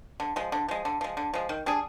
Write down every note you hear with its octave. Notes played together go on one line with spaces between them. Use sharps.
D3
F3 G#3
D3
F3 G#3
D3
F3 G#3
D3
F3 G#3
D#3
G3 D4 G#4